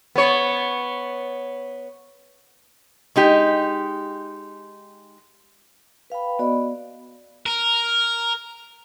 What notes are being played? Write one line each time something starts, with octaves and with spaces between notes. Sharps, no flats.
B3 C#5
G#3 D#4 G4
B4 F5 G5 B5
B3 F#4 D5 D#5 B5
A#4